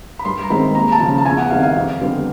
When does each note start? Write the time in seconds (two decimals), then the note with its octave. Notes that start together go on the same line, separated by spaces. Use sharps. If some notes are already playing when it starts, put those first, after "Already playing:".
0.19 B5
0.25 G2 C6
0.43 A#5
0.50 D#3 G#3 C4 B5
0.75 D#2 A#5
0.92 A5
1.00 C#3 F3
1.18 A5
1.26 E2 G#5
1.38 F#5
1.50 C3 D#3 G3 F5
1.63 F5
1.76 F2
2.01 D3 G3 B3